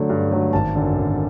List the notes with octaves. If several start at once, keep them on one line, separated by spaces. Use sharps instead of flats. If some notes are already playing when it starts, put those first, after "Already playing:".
Already playing: D3 F#3 A3
G2
D3 F#3 A3
G#1 A5
F#2 D3
G#1